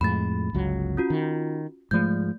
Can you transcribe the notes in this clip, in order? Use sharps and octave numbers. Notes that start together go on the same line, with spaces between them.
F2 A2 G#3 B5 A6
G1 C#2 F#3
C#4 F4 F#4
D#3
G#2 F3 G#3 A3 G6